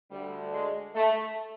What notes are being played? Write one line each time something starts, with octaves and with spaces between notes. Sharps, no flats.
D2 D3 G3
G#3
A3